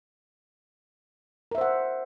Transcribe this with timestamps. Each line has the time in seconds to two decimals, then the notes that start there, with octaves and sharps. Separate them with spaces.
1.51 A#4
1.55 E5
1.58 C5
1.61 F#5